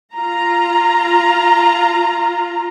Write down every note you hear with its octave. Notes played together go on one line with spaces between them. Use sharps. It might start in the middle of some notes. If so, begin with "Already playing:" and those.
F4 A#5